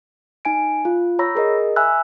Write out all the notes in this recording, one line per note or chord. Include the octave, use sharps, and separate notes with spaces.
D#4 G#5 D7
F4
C#5 A#5 B5 E6 A#6
G#4 A#4 D#5
E5 G#5 B5 E6 F#6